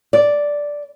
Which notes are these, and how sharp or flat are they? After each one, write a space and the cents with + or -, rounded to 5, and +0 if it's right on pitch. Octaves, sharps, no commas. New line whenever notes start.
D5 -5